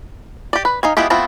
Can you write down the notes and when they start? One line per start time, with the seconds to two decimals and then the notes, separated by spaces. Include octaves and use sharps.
0.53 G4 D5
0.65 B4
0.83 D#4 F5 G#5
0.97 G#3 B3 E4 F4 G4
1.10 A3 B3 C4 E4 F4